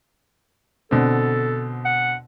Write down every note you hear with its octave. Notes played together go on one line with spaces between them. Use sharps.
B2 D3 C4 A4
F#5